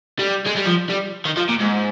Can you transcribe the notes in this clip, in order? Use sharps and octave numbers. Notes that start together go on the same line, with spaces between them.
G3
G#3
G3
F3
G3
D#3
F3
A#2
G#2